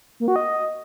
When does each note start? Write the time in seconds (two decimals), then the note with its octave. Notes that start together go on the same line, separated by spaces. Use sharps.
0.20 A#3
0.28 F#4
0.36 D#5